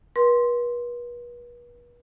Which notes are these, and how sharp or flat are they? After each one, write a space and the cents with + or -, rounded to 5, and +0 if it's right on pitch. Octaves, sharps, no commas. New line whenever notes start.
B4 -40 C6 +0